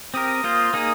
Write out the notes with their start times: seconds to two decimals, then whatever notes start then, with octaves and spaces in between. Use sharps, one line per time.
0.14 C4 G4 A#4 D#6
0.44 A#3 F4 C5
0.73 A#3 D#4 G#4 D#6